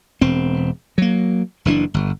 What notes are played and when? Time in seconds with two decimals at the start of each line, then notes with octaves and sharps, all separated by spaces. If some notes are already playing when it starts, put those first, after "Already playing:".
0.21 E1 C4
0.98 F#3 A#3
1.65 F#1 E3 C#4 D4
1.94 G1